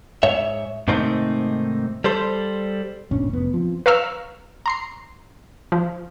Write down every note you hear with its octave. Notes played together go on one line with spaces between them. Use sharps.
G#2 C#5 E5
G#2 C3 D#3 A3 C4 D#4
G3 A4 C5
G1 A#2 C#4 D4
F1 B3
F3 C4
B4 F5 A#5 C#6 E6 F6
A#5 C6 C7
F3